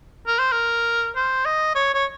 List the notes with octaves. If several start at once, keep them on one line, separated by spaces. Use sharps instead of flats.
A#4
C5
A#4
C5
D#5
C#5
C#5